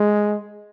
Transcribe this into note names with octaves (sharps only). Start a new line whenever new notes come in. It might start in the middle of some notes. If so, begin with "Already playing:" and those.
Already playing: G#3